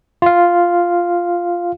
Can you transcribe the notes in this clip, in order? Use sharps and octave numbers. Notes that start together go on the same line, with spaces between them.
F4 F5